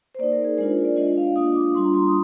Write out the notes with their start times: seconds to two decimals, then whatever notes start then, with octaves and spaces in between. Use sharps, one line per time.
0.15 C5
0.19 A#3 D#4 D5
0.32 A#4
0.45 G#4
0.58 G#3 D4 F4 A#4
0.85 D5
0.97 G#3 D4 F4 D#5
1.17 F5
1.36 A#3 D4 F4 D#6
1.55 D6
1.75 G3 D4 F4 C6
1.85 A#5
1.94 C6
2.07 D#6